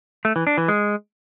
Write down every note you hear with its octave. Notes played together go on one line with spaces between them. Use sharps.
A3
E3
D4
E3
G#3